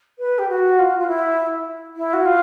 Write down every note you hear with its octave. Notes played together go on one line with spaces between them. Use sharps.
B4
G4
F#4
F4
F4
E4
E4
F#4
F4